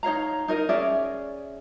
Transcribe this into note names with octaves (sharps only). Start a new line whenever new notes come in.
D#4 C#5 F5 A#5
D#4 A#4 D#5
C#4 G#4 D5 E5